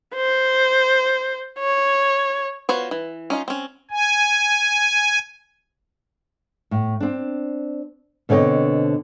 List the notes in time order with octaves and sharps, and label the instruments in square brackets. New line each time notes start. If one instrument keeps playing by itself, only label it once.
[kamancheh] C5
C#5
[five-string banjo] B3 F4 F#4 C5 C#5
E3
C#4 D#4 F4
C4 C#4
[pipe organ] G#5
[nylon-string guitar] A2
C4 D4
B2 D3 C4 C#5 D#5